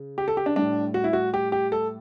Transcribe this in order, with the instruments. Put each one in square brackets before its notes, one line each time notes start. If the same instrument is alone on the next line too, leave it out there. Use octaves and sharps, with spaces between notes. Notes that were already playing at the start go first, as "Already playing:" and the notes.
Already playing: [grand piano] C#3
G4
A4
G4
D4
A2 G3 D4
F#4
E4
F#4
G4
G4
A4